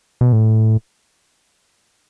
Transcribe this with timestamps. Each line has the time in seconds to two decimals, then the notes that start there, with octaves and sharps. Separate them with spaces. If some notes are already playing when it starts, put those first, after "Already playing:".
0.21 B2
0.33 A2